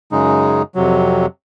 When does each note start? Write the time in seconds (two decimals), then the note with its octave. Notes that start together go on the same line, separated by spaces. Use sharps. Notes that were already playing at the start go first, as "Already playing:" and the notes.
0.12 F#2 C#3 G#3 D#4
0.75 F2 C3 F#3